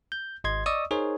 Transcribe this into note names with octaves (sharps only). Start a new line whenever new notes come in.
G6
G#1 D#5 C6 G#6
D5 D#5 C#6 D#6 E6
D#4 G#4 A#4 C5 C#5